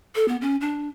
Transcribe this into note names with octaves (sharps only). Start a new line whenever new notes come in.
A4
B3
C#4
D4